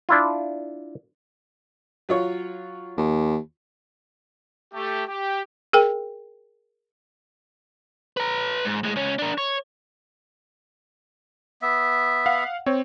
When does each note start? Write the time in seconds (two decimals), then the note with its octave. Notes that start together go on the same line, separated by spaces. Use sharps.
0.09 D4 E4 F4
2.09 F#3 F4 C#5
2.97 D#2
4.74 A3 G4
5.08 G4
5.73 G#4 A#4 G5
8.17 B4 A#5
8.65 G#2
8.83 A2 G#3
8.96 C#2 C#4
9.19 D4 A#4
9.38 C#5
11.62 B3 E5
12.26 F5 F#5
12.66 C4 C#5